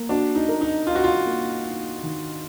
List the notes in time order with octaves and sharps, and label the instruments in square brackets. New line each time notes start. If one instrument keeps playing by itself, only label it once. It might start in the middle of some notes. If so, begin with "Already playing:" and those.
Already playing: [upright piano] A#3
[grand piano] D4 [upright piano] F#4
[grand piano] D#4
[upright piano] A#4
[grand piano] D#4
[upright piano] D#4 [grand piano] F4
[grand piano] F#4
F4
[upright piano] A#3
D#4
D#3